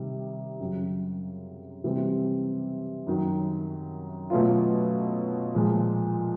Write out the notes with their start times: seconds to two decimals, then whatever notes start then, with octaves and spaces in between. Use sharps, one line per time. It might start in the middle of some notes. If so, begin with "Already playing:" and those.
Already playing: C3 D#3 G3
0.60 F#2 C#3 F#3
1.84 C3 E3 G3 C4
3.07 F#2 D#3 F#3
4.30 B2 F#3 A3 C#4 F4
5.55 A#2 F3 G#3